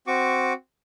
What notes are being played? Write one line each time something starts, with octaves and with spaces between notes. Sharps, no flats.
C4 F#4 C#6 D6